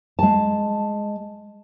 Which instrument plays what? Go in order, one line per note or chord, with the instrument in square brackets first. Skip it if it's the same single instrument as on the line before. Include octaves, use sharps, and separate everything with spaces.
[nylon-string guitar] G#3 A5